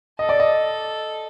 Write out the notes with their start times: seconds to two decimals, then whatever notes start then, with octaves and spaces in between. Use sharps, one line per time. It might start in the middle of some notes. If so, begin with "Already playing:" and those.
0.19 A4 D#5
0.29 D5
0.40 D#5